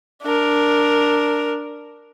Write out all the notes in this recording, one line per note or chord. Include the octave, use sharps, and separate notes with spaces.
D4 A#4